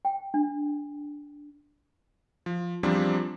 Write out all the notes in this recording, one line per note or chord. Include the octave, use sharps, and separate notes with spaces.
G5
D4
F3
E2 F3 G3 C4 D4